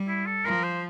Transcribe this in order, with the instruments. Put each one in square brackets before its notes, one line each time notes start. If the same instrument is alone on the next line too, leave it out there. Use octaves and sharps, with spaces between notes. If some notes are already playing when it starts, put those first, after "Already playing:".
Already playing: [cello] G3
[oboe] E4
A4
[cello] F3 [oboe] A#4
[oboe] C5